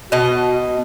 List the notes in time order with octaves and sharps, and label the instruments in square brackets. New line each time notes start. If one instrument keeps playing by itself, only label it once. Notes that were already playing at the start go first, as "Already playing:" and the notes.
[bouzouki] B2 D#5 [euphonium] F#4